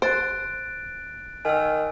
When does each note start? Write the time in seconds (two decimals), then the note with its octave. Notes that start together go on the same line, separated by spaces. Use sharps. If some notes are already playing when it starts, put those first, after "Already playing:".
0.02 C5 F#6 A6 D7
1.45 D#3 G#5 E6